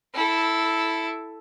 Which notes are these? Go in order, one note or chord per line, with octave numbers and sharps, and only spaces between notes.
E4 A4